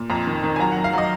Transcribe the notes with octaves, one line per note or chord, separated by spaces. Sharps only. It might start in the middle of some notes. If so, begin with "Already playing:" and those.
Already playing: A#2
F2 A#5
D#3
D#3
G#5
F#3 A#5
F#5
F#3
F5
F#3 D#5